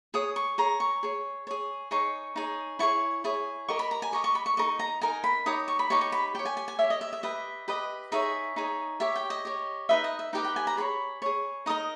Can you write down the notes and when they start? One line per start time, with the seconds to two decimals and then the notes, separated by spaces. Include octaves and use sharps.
0.14 G#4 C#5 D#6
0.36 C#6
0.58 G#4 C#5 A#5
0.80 C#6
1.03 G#4 C#5
1.47 G#4 C#5
1.91 D#4 G#4 C#5 C#6
2.36 D#4 G#4 C#5
2.79 E4 G#4 C#5 C#6
3.24 E4 G#4 C#5
3.69 G4 A#4 D#5 C#6
3.79 B5
3.91 A#5
4.02 G#5
4.12 G4 A#4 D#5 C#6
4.24 C#6
4.35 B5
4.46 C#6
4.57 D#4 A#4 D#5 C#6
4.79 A#5
5.01 D#4 A#4 D#5 G#5
5.24 B5
5.46 D#4 G4 C#5 D#6
5.68 C#6
5.79 B5
5.90 D#4 G4 C#5 C#6
6.01 C#6
6.12 B5
6.35 G4 C#5 G5
6.45 G#5
6.57 G#5
6.68 G#5
6.79 G4 C#5 E5
6.90 D#5
7.01 E5
7.13 E5
7.23 G4 B4 D#5 E5
7.68 G4 B4 D#5
8.12 D#4 G#4 C#5 E5
8.56 D#4 G#4 C#5
9.00 G4 C#5 E5
9.16 G5
9.30 D#5
9.45 G4 C#5
9.89 D#4 G4 B4 D#5 E5
10.04 D#5
10.19 E5
10.33 D#4 G4 B4 D#5 G5
10.45 G5
10.56 G#5
10.67 A#5
10.77 G#4 C#5 B5
11.22 G#4 C#5
11.66 D#4 A#4 D#5 D#6